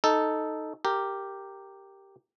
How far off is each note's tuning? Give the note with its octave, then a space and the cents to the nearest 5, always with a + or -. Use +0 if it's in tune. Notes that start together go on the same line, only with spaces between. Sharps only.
D#4 +0 A4 -5
G4 +0 A#4 -10